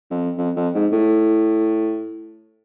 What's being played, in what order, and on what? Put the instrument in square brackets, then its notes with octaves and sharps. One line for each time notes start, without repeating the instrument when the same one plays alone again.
[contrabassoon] F2
F2
F2
G#2
A2